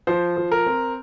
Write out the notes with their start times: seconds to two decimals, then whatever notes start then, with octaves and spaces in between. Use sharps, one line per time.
0.07 F3 C5
0.37 F3
0.52 A#4
0.66 C4